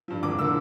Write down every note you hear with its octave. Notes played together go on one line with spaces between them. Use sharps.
G2 F3
E1 D6
D3 F3 E6